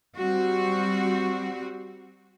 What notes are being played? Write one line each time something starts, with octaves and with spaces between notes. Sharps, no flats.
G3 C4 F#4